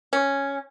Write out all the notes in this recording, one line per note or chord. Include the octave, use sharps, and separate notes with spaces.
C#4